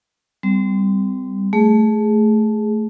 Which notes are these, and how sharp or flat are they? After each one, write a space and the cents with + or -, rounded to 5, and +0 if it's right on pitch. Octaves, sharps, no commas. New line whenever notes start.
G3 +0 C4 -30
A3 -10 G#4 -5